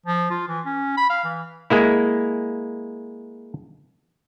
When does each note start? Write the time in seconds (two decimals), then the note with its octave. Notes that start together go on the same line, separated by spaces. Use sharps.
0.06 F3
0.30 F4
0.48 E3
0.65 C#4
0.97 B5
1.10 F5
1.24 E3
1.70 G#3 A#3 E4